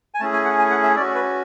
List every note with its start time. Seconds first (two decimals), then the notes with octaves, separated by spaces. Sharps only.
0.14 G#5
0.20 A3 C#4 E4 G#4 A5
0.33 G#5
0.45 F#5
0.59 G#5
0.70 F#5
0.83 E5
0.96 C#4 D5
1.00 F#4
1.15 B4